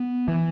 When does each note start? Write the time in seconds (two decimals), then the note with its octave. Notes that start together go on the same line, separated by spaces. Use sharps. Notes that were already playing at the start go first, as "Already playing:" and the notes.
Already playing: B3
0.28 E3